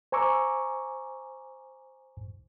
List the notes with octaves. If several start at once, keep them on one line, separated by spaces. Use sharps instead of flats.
C5 G#5 A#5 C#6 D6 E6